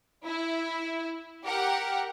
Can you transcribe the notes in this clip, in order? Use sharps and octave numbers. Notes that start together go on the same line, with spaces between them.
E4
G4 A#4 F#5